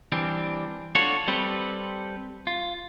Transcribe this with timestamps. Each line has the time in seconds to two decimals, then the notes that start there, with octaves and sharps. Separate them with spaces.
0.12 E3 G3 C4 D4
0.95 D4 F4 F#4 A4 C#5
1.28 G3 C4 G4 A4 B4
2.47 F4